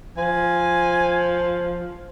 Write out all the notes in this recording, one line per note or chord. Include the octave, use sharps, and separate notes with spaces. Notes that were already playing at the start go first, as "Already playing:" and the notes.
F3 G#5